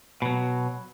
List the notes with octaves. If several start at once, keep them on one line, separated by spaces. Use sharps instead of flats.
B2 F#3